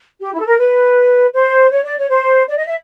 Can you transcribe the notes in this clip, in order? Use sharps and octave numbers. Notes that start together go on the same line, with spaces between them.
G4
E4
A4
A#4
B4
C5
C#5
D5
C#5
C5
D5
D#5
E5